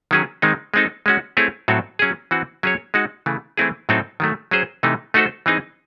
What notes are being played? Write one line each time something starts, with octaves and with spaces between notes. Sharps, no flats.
D#3 F#3 C#4 G#4
D#3 G#3 C4 D#4
G#3 C4 D#4 A4
G#3 C#4 F#4
A3 C4 E4 G#4 C#5
A2 F#3 C4 F#4 A4
F#3 C#4 G#4
E3 C4 F#4
F#3 C#4 G#4 C#5
G#3 D#4 F#4
C#3 E3 A3
E3 A3 C4 E4 G#4
A2 F#3 C4 D#4 A4
D#3 F#3 A3
F#3 C#4 G#4 C5
C3 E3 A3 D#4
A3 D#4 F#4 A4 C5
E3 C4 D#4 G#4